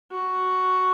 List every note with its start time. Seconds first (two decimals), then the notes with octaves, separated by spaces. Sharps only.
0.11 F#4